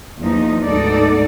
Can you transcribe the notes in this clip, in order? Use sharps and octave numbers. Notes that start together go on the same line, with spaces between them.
E2 F3 A#3 D#4
D2 G#2 B3 D#4 A4 D5